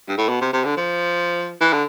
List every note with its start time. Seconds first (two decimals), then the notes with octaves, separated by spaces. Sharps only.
0.08 G2
0.17 A2
0.29 B2
0.41 C3
0.53 C3
0.65 D3
0.77 F3
1.60 E3
1.73 D3